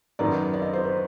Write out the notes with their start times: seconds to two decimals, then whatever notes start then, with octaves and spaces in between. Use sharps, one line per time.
0.19 F#2 D#3 F#3 B3 D5
0.54 D5
0.62 D#5
0.73 C5
0.84 B4